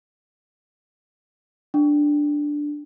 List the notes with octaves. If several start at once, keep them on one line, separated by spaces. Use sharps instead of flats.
D4